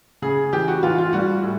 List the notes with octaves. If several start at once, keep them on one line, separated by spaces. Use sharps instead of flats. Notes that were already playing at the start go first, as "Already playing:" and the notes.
C#3 G#4
E3 G4
F#4
E3 F4
F4
G3 F#4
A2